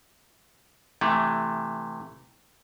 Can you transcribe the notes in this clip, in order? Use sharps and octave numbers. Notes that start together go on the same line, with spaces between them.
C3 E3 A3